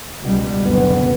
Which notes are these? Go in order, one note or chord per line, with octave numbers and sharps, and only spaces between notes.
C#2 B2 G3
F#1 D2 B3